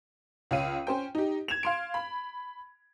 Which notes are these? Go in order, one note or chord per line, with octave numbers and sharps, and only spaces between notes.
C#2 C#5 F5 D#7
C#4 C5 G5
D#4 G4
G#6 E7 F7
F5 C6 D7
B5